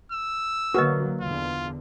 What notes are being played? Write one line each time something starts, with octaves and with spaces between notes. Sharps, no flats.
E6
D3 F#3 A#3 F#4 A#4 B4 D#5
E2 D3 F4